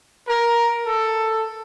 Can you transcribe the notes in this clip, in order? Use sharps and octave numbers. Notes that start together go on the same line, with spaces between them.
A#4
A4